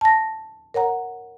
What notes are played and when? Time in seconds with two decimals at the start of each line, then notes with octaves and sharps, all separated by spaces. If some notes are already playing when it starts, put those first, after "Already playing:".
0.01 A5 A#6
0.74 A#4 C#5 F#5 A#5